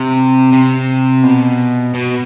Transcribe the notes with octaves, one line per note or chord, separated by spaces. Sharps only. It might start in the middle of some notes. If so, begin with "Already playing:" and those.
Already playing: C3
C3
B2
B2